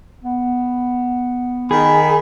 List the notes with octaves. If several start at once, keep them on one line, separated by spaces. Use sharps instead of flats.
B3
D#3 G#4 B5